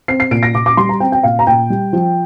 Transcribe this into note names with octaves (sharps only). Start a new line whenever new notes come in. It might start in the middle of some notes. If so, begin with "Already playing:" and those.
C4 C7
C7
A#2 D7
A#6
A#2 D6
D6
G3 C6
A#5
C4 G5
G5
A#2 F5
A#5
A#2 G5
G3
F3